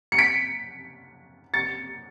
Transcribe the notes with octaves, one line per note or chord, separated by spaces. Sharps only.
C#7
B6 D7
A6 C#7